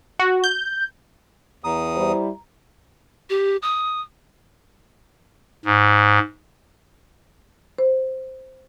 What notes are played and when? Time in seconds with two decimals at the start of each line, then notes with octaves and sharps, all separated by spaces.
0.19 F#4
0.44 G6
1.64 E2 A#5 D#6
1.94 G3 E4 C5
3.30 G4
3.62 D#6
5.65 G#2
7.78 C5